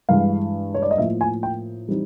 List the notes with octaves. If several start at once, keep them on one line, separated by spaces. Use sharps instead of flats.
G2 E3 G#3 F5
C#5
D5
D#5
A2 F3 A#3 E5
G#5
G5
E3 G3 C4 D#4